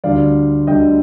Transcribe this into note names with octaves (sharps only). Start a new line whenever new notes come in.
D2 D3 G3 D5 F5
D2 D3 G3 D#5 G5